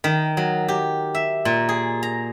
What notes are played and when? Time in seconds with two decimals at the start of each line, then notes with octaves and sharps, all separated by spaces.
0.04 D#3
0.37 F#3
0.68 G4
1.15 E5
1.45 A#2
1.69 G#4
2.03 A#5